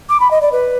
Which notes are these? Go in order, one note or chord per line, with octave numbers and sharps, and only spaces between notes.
D6
B5
D#5
D5
B4